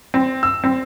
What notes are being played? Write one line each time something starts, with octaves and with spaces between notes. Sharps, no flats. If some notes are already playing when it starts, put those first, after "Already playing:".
C4
E6
C4